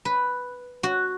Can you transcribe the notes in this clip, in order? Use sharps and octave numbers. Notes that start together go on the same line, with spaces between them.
B4
F#4